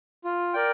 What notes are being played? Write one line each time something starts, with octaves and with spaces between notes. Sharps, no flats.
F4
A#4 D5 G5